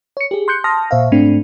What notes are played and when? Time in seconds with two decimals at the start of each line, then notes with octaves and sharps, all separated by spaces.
0.17 C#5 C#7
0.31 G4 G#4
0.48 C6 F#6 G6 C#7
0.64 A5 C6 D#6 F6 A#6
0.91 A#2 C5 E5 F5
1.12 G#2 A3 C4 D4